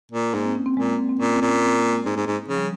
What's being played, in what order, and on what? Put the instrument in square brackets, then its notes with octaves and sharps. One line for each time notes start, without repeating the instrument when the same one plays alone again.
[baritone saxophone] A#2
[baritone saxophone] G#2 [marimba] A#3
[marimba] C4
C#4
C4
[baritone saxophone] A#2 [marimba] G#3
[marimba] A#3
C4
C4
[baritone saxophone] A#2 [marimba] C#4
[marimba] C4
[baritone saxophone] A#2
[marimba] C#4
C4
A#3
G#3
[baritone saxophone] G#2
G#2
G#2
[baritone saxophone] C#3 [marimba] F3
[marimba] G3